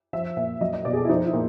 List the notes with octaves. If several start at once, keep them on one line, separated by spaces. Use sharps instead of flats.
F3 E5
A#2 E5
F#3 D#5
D#5
B2 D5
G#4
A4
E4
F3 D#4
E4
A#2